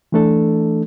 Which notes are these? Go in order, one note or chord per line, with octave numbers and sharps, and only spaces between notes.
E3 A3 D4 A4